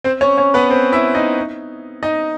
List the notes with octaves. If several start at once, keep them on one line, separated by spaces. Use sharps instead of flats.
C4 C5
C#4 C#5
C#4 C#5
B3 B4
C4 C5
E4 E5
D#4 D#5
D#4 D#5